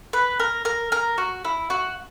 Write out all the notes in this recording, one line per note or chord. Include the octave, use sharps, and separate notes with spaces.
B4
A#4
A#4
A#4
F#4
E4
F#4